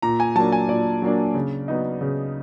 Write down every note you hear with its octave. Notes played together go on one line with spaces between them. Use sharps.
A#2 A#5
G#5
F#3 A#3 D4 A5
G#5
A#2 D5
F#3 A#3 D4
C#3
F#3 B3 D#4
C#3